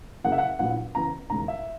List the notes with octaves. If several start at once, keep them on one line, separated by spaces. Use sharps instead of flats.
F#1 F#2 C#3 F#3 A#3 F#5
E5
F#5
A#1 A#2 F#3 B3 E4 F#5
F#1 F#2 E3 B3 A#5
E1 D#2 C#3 G#3 A#5
E5